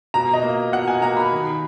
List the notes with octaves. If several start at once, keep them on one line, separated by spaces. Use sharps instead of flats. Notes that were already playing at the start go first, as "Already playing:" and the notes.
B2 A#5
D#5
A#3
B2 F#5
G#5
A#3 A#5
B5
D#3